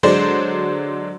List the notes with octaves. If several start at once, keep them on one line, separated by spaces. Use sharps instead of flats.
D3 F#3 G#3 D4 C5 D5